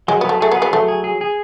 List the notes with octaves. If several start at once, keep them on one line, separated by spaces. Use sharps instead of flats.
F#3 G#3
B3
F#3 A3
A3 G#4
B3
G#4
B3
F#3 A3
G#4
G#4
G#4